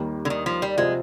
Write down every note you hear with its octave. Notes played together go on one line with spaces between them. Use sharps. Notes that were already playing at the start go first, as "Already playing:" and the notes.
Already playing: D#2 D#3 G3
D3
D#3
F3
G3
C3 F3 G#3 C4 F4